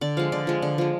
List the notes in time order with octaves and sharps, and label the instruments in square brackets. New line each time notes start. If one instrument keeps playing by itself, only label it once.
[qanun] D3 D5
F3 G#3 F5
D3 D5
F3 G#3
D3
F3 G#3